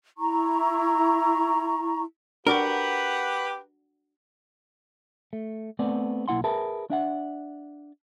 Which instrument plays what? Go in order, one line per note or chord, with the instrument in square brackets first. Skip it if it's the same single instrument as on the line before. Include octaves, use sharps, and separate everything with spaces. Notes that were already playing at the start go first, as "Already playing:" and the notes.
[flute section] E4 A#5 C#6
[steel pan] D4 F#4 D6 [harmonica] G4 B4 F#5 [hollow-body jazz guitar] A#4
[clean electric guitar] A3
A3 B3 C4 D5
B1 A#3 E4 F#5 C6
G#4 A#4 B4 E5 A5
D4 E5 F#5